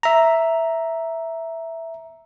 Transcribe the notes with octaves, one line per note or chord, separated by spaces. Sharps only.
E5 A#5